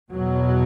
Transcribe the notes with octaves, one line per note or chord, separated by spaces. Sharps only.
E2 B2 F#3